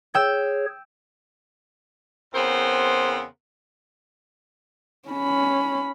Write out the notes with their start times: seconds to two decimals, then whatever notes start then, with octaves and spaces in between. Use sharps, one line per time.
0.15 G#4 C#5 G5 E6
2.33 E2 C#3 B3 C4 A#4 C5
5.09 C#4 B5